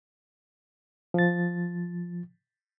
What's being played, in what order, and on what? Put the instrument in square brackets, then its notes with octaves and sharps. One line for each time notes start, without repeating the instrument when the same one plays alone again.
[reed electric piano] F3 A6